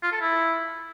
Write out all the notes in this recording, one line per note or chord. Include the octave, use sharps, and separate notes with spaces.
F4
A4
E4